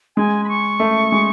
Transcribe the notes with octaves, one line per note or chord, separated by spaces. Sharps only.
G#3 G#5
B5
C#6
A3
G#3